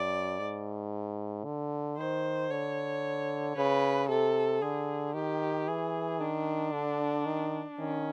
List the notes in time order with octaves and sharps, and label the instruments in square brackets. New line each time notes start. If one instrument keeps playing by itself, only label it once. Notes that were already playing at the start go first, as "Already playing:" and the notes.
Already playing: [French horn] F#2 [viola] D5
[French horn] G#2
D3
[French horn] D#3 [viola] C5
[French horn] D3 [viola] C#5
[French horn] C#3 [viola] B4
[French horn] C3 [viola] A4
[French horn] D3 [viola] G#4
[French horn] D#3 [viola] G4
[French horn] E3 [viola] G#4
[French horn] D#3 [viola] D4
[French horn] D3
D#3
[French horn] D#3 [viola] C#4